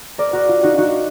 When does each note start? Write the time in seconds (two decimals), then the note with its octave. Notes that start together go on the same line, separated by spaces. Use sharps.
0.18 A#4 D5
0.33 F#4 A#4
0.49 F4
0.63 D#4 F#4
0.78 D#4 F#4